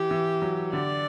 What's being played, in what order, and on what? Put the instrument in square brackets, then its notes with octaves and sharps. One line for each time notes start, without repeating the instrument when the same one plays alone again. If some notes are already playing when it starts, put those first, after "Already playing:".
Already playing: [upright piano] E3 [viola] G4
[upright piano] E3
F#3
[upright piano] D3 [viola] D5